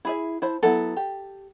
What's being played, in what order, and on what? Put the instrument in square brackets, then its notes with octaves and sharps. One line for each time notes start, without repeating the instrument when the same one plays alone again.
[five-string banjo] E4 G#4 E5
E4 C5 A5
[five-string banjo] F#3 B3 E4 [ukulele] A4
[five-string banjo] G4